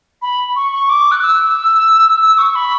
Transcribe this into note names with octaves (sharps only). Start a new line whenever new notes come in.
B5
C#6
C#6
D6
F#6
E6
E6
C#6
B5